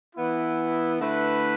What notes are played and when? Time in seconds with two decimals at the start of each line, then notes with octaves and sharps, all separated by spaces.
0.16 E3 B3 E4
1.00 D3 A3 E4 B4